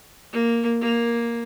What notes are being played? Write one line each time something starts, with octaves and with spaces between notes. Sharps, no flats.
A#3
A#3